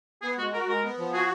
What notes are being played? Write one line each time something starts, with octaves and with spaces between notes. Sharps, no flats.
B3 G#4
G#3 F#4
F#4 A#4
G#3 A#4
B3
F3
F#4 G#4